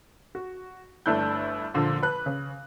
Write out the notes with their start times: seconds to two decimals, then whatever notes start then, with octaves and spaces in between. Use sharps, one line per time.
0.35 F#4
1.06 G1 A3 D4 E4 F#6 G6
1.74 A#2 D3 F3
2.03 B4 F#6
2.26 C#3